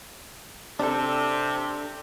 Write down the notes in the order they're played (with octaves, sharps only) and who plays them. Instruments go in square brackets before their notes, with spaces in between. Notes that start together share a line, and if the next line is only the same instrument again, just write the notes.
[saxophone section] C3 [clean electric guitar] D4 A4